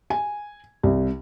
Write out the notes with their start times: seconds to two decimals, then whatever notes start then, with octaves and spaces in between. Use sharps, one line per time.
0.10 G#5
0.83 C2